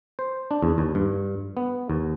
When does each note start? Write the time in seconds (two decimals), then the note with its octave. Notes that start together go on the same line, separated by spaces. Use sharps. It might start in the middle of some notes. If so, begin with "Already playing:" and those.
0.19 C5
0.51 D4
0.62 E2
0.78 D#2
0.95 G2
1.57 B3
1.90 D#2